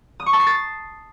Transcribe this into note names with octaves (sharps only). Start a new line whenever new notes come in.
D#6
C#6
A5
C7
A6